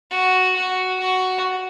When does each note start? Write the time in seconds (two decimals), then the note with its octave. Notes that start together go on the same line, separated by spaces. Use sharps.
0.11 F#4
0.56 F#4
1.00 F#4